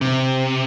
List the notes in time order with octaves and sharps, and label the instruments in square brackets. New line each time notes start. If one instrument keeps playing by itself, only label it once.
[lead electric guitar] C3